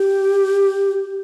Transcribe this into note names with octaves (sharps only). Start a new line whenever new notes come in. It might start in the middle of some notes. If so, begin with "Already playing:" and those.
Already playing: G4